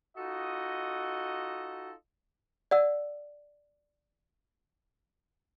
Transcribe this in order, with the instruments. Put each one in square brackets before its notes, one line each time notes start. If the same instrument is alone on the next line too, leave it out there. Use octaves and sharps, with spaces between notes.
[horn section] D#4 F4 F#4 A4 D#5
[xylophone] D5 F#5 E6